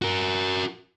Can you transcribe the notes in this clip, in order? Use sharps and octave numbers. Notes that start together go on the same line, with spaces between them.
F#4 A#4